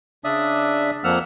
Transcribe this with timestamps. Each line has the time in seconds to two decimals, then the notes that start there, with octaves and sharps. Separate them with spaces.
0.24 C#3 D4 D5 E5 D#6
1.04 F2 F3 A#3 F#5 E6 F6